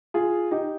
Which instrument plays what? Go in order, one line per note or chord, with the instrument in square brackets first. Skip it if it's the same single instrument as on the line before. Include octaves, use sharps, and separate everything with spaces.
[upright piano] F4 G#4
D#4 G4